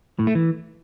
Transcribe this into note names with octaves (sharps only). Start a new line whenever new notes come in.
A2
A3
E3